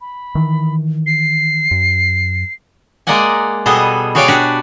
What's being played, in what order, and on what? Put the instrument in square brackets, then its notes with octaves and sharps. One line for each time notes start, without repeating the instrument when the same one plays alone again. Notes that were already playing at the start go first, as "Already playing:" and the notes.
[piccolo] B5
[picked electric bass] D#3 E3
[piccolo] C7
[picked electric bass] F#2
[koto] G#3 A#3 D5 D#5 F#5 G#5
B2 G3 B3 G#4 A4 D#5
F#4 G#4 C#5 D5 F5 G5
D4 F#4 G4 B4